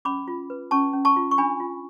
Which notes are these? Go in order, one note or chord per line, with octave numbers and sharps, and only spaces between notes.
C#4 B5 D6
F4
B4
C#4 A5 C#6
C#4
A5 C#6
F4
C#6
D4 G#5 B5
F4